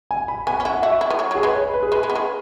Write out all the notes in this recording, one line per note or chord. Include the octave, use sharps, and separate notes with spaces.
G#5
B5
B3 G#5
C#4
E4 F#5
F#4 E5
E4
B3
F#3
F#3 G#4
G#3 B4
C#5
B4
G#4
G#3 B4
G#3
B3
G#3